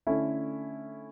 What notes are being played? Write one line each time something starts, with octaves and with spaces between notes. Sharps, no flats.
D3 A3 C#4 E4 A4